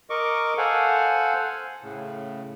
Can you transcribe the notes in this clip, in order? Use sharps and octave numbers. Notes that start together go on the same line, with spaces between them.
A#4 D#5 C#6 D6
A4 C5 F5 F#5 G#5
A2 C#3